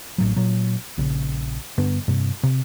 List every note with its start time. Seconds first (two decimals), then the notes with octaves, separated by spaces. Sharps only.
0.18 A1 A2 F#3
0.36 A#2 F#3
0.98 A#1 C#3
1.78 G2 D3 B3
2.08 G2 C3
2.43 C3